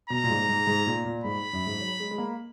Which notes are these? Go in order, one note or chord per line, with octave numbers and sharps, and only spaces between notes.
B2 A#5
A#2
G#2
G#2
G#2
A#2
A#2
G#2 B5
F#2
G#2
F#3
G#3
G#3
A#3